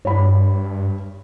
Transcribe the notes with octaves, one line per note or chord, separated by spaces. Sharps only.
G2 C#5 B5